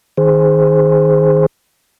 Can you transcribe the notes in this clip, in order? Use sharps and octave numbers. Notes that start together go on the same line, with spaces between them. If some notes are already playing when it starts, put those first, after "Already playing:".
D#3 G#4 C5